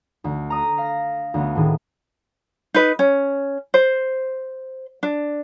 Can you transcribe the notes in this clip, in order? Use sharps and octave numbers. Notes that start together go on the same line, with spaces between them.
D2
A#5 D#6
F5 A#6
D2 B3
A2 D#3 G#4
D#4 B4
C#4
C5
D4